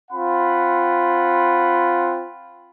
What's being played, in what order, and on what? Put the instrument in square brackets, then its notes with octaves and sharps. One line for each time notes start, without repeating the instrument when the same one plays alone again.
[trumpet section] C4 F4 F#5 B5